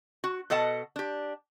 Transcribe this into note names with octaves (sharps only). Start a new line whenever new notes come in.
F#4
B2 A4 D#5 F#5 A5
D4 G4